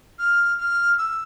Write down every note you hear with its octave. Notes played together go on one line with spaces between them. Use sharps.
F6
F6
E6